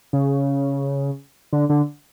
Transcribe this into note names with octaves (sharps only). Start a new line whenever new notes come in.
C#3
D3
D3